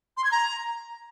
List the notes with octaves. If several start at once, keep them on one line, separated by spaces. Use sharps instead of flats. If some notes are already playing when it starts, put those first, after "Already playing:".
C6
G#6
A#5